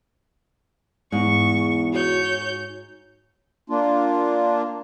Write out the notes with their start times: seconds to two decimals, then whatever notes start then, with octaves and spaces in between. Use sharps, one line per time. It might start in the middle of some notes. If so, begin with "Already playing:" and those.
1.12 E2 G#2 C#6
1.93 F#4 C#5 G6
3.70 A#3 D4 F4